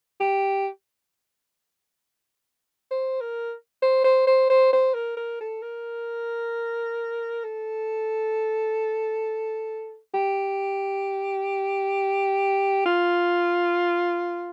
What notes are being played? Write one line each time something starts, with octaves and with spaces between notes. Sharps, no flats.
G4
C5
A#4
C5
C5
C5
C5
C5
A#4
A#4
A4
A#4
A4
G4
F4